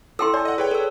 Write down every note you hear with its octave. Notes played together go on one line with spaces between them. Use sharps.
E4 A4 G5 C6 E6
D5 G#5 A5
D#5 F#5
G#4 B4 C#5 G5
A4 E6